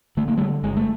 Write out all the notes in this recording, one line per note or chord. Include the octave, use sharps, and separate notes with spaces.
D3 A3
A#3
D3 G3 A3
G1 G#3
A3